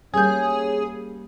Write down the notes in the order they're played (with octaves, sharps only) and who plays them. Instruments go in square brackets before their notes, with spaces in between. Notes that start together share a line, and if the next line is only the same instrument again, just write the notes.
[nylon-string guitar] G3 A#3 [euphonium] C#4 [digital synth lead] G#4 [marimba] G#5 G6